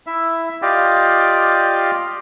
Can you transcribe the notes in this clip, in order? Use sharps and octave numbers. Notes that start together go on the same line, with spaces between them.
E4 E5
F4 G4 D5 D#5 F5 G5